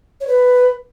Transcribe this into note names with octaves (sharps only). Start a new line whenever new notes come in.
C#5
B4